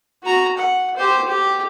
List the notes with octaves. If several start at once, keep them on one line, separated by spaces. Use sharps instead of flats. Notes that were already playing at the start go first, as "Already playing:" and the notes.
F#4 A#5
F#5
G4 C5
G4